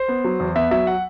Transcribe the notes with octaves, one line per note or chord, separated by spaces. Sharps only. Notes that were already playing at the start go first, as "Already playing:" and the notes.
Already playing: C5
B3
F#3
E2
B3 E5
F#3 E5
F#5